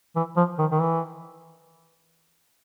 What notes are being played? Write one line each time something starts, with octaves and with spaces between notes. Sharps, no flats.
E3
F3
D#3
D#3
E3